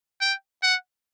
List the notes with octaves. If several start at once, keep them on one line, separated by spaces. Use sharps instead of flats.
G5
F#5